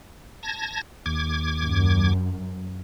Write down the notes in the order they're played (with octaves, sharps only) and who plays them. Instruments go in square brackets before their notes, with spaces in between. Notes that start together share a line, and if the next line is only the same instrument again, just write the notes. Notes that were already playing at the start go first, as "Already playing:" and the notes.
[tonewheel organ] A5 G#6 A#6
D#2 D6 G#6
[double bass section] F#2